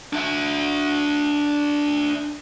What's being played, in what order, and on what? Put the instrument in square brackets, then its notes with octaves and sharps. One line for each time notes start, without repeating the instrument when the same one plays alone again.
[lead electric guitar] D4 E5